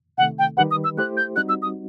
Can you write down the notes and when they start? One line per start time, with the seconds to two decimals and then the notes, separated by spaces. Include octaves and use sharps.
0.18 C3 D#3 A3 F#5
0.39 G5
0.57 D#3 G3 D#4 G4 B4 F#5
0.71 D#6
0.84 E6
0.97 A3 E4 G4 C5 F#6
1.17 G6
1.36 G3 C4 D#4 F#4 F#6
1.49 E6
1.62 D#6